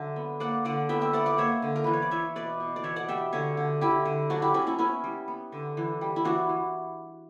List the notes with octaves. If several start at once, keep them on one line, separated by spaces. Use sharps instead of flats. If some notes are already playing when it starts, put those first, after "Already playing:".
Already playing: D3 F#3 E5
B3
A#3 D5 F#5
D3 D5 F#5
B3 E5 G5
E5 G5
B3 D5 F#5
D5 F#5
A#3 C#5 E5
D3
A#4
E3 B4
C#5
D5
E3 C#5 E5
B2 B4 D5
B2
D5
E3 C#5 E5
D5 F#5
G3 E5 G5
D3 C#5 E5
D3
D3 E4 G4
D3
F#3 D4 F#4
E4 G4
F#3 C#4 E4
C#4 E4
B3 C#4 E4
G3
B3
D3
E3
G3
E4
E3 D4 F#4
E3